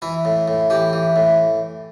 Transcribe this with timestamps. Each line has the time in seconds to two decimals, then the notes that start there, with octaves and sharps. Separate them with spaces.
0.02 E3 E4
0.25 A2
0.48 A2
0.70 E3 G4
0.93 E3
1.16 A2